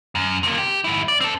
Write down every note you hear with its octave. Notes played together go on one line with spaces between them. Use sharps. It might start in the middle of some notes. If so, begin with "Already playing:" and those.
F#2
C3 A#3
G4
G#2 E4
D5
C4 A4